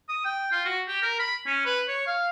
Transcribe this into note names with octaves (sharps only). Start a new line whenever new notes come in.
D#6
G5
F4
F#4
G4
A#4
B5
C#4
B4
C#5
F5